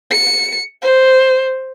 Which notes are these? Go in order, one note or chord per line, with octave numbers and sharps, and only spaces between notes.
C#7
C5